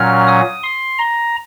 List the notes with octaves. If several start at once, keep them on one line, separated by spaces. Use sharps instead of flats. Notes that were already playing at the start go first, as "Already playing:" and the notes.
Already playing: A#2 F#3 C#4 F6
D#6
C6
A#5